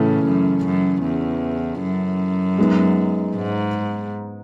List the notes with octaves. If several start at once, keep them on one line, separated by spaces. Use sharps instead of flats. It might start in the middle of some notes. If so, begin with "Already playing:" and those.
Already playing: A2 C#3 E3 A3 C#4
F#2
F#2
E2
F#2
G#3 B3 D#4
G#2